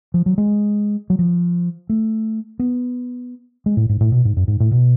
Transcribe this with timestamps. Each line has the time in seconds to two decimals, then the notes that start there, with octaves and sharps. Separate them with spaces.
0.14 F3
0.26 F#3
0.38 G#3
1.10 F#3
1.19 F3
1.89 A3
2.59 B3
3.66 G#3
3.77 A2
3.89 G#2
4.01 A2
4.12 B2
4.25 G#2
4.36 F#2
4.48 G#2
4.60 A2
4.71 B2